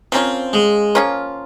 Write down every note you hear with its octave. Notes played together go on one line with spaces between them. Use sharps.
F3 A#3 C4 C#4 F4
G#3
F3 A#3 C#4 F4